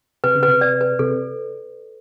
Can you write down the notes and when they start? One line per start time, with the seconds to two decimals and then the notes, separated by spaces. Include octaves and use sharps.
0.24 C3 B4
0.35 C#3
0.43 B4
0.48 C3
0.61 D5
0.81 B4
0.99 C3 A4